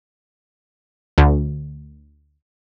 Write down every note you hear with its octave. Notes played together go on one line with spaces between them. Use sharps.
D2